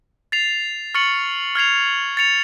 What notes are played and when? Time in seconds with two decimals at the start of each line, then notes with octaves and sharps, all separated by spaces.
0.32 A6 C7 F7
0.94 C#6 F6 A6 C#7 F#7
1.55 F6 G#6 C7 F7
2.17 A6 C#7 F7